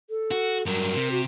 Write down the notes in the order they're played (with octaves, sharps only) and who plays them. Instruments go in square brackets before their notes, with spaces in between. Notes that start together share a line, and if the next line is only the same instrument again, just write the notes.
[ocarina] A4
[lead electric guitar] F#4
[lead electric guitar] G2 F#3 [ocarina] A#4
[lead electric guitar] C3
[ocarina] F#4